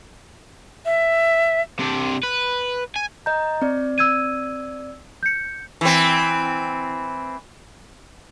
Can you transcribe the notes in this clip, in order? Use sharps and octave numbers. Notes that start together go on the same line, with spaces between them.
E5
C3 D4
B4
G#5
D#5 A#5 G6
C4 D5
E6 G#6 D#7
G6 C#7
E3 C4